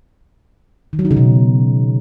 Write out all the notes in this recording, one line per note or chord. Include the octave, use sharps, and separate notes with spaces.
D#3
F#3
D#4
C#3
B2